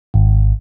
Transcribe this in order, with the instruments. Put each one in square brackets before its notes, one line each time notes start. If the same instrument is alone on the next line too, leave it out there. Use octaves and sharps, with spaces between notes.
[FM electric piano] G#1